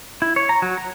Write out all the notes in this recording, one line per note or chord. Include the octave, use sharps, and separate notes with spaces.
E4
C#5
A#5
F#3
A#5